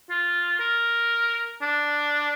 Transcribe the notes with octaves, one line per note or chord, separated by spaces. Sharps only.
F4
A#4
D4